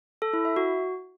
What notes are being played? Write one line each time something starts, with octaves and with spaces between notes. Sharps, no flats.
A4
E4
E5
F#4